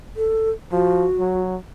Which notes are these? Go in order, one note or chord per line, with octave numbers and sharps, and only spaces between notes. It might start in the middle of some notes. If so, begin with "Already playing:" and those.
A4
F3 F#4
F#3